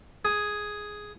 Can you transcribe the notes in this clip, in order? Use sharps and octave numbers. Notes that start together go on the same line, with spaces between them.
G#4